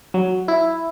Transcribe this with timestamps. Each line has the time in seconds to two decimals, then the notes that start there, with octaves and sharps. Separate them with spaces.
0.14 F#3
0.48 E4